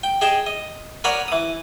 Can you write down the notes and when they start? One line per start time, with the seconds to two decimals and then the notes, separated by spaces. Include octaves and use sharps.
0.03 G5
0.21 G#4 D#5 G5 A5
0.47 D#5
1.04 A#4 C#5 D5 F#5 B5 D#6
1.28 E3 D#6